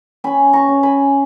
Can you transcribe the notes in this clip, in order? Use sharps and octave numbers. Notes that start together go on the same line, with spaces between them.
C#4 G#5 B5
A#5 C#6
C#4
G#5 B5